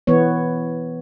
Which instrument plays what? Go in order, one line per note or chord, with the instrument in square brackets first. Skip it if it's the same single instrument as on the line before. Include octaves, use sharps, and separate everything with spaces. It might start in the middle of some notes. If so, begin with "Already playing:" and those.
[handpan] E3 B3 C#5